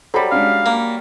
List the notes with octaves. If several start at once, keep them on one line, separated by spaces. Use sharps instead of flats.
F#3 G3 A4 C5 B5
G#3 C#4 D4 F5
A#3